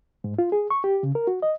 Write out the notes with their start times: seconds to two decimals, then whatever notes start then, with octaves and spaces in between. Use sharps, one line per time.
0.24 G#2
0.39 F4
0.52 G#4
0.70 C#6
0.84 G4
1.03 C#3
1.15 A#4
1.27 F#4
1.42 D#5